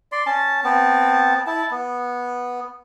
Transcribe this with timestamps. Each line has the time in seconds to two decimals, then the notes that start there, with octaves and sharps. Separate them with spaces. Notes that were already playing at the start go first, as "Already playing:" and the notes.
0.12 D5 C6
0.26 C#4 A5
0.64 B3 C4 A5
1.47 E4 A5
1.71 B3